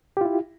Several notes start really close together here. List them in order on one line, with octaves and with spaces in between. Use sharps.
G4 F4 E4